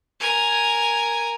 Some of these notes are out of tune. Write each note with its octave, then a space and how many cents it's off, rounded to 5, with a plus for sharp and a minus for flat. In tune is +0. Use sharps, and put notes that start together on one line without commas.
A#4 +0 G#5 +0